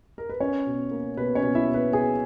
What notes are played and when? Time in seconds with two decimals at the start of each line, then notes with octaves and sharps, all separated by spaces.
0.18 A#4
0.29 B4
0.40 C#4 C#5
0.67 B2
0.91 A#3
1.17 B2 B4
1.35 C#4 C#5
1.43 B2
1.55 E4 E5
1.68 B2
1.74 B4
1.93 B2 G#4 G#5